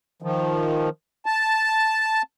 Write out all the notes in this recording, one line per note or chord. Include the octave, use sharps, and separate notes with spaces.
D#3 F3
A5